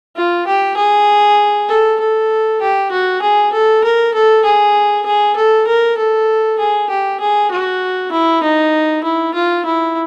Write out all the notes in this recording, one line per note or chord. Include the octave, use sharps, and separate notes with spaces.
F4
G4
G#4
A4
A4
G4
F#4
G#4
A4
A#4
A4
G#4
G#4
A4
A#4
A4
G#4
G4
G#4
F#4
E4
D#4
E4
F4
E4